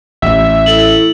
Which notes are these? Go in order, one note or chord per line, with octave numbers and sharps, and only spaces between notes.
A1 E5
E4 A4 F#7